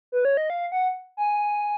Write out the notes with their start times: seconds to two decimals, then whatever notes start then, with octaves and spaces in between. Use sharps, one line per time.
0.12 B4
0.25 C#5
0.37 D#5
0.50 F5
0.72 F#5
1.17 G#5